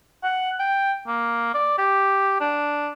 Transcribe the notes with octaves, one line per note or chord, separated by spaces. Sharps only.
F#5
G5
A#3
D5
G4
D4